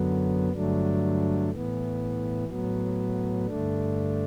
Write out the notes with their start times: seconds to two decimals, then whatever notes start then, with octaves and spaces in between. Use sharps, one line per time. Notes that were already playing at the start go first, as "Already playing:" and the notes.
Already playing: F#2 D3 F#3 B3
0.52 G2 D3 F#3 A3 D4
1.50 A2 E3 B3
2.48 A2 F#3 B3
3.46 G2 D3 A3 D4